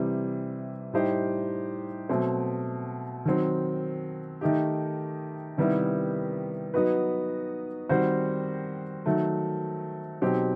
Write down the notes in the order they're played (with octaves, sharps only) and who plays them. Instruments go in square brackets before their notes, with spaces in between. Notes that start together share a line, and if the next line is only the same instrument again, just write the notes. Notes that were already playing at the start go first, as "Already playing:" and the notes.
Already playing: [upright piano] C3 E3 G3
A2 G3 D#4 G4 C5
B2 F#3 A3 C4
D#3 F#3 C4
D#3 A3 D#4 G4
C3 D#3 G3 B3 E4
F#3 B3 D#4 F#4 B4
D#3 G3 C4 F#4 C5
D#3 F#3 A3
B2 F#3 C4 D#4 G4